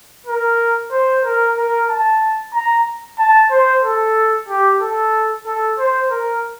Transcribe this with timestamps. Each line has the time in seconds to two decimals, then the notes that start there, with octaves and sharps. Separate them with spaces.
0.27 A#4
0.91 C5
1.24 A#4
1.57 A#4
1.89 A5
2.54 A#5
3.19 A5
3.51 C5
3.84 A4
4.48 G4
4.81 A4
5.46 A4
5.79 C5
6.11 A#4